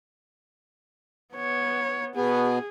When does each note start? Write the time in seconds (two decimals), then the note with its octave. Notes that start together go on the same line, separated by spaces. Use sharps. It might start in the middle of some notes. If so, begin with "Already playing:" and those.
1.35 B3 C#5
2.15 B2 B3 G#4